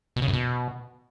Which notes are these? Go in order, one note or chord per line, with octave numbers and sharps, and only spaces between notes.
B2
C#3
F#2
B2